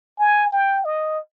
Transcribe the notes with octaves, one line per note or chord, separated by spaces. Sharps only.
G#5
G5
D#5